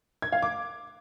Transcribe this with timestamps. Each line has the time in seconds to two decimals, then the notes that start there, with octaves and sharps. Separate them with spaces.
0.22 G#6
0.32 F5
0.42 D6